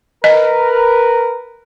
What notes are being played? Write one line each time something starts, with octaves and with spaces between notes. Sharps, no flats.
A#4 B4 D#5